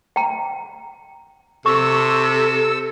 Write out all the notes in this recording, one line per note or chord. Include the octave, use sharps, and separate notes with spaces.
G5 A#5
C3 A4 C#6 E6